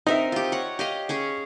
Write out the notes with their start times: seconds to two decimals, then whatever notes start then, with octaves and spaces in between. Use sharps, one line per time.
0.07 C4 D#4 A#4 E5
0.32 F4 G4
0.52 C#5 F#5
0.79 G4 D#5 F5
1.09 C#4 G#4 C#5